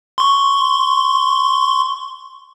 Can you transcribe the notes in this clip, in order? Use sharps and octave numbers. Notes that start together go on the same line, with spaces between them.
C6 C#6